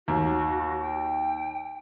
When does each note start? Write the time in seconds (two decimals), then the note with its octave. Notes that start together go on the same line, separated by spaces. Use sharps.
0.08 D#2 F#4
0.81 G5